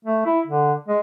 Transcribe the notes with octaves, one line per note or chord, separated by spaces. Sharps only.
A3
E4
D3
G#3